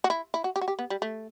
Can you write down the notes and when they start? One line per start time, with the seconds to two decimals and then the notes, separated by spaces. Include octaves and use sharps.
0.04 F#4
0.10 E4
0.34 E4
0.44 F#4
0.56 G4
0.61 F#4
0.68 G4
0.79 B3
0.90 G3
1.02 A3